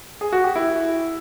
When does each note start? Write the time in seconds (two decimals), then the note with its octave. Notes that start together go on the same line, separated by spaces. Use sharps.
0.21 G#4
0.33 F#4
0.44 G4
0.56 E4